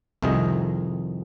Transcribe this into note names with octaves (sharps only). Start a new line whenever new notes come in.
C2 F2 C3 D#3 G#4 D#5